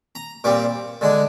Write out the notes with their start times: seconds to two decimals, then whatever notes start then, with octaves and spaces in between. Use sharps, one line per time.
0.15 A#5
0.44 A#2 G3 C4 D6
1.01 D3 G#3 D4